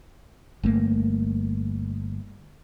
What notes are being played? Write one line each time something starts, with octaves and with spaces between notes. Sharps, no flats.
G1 A3 A#3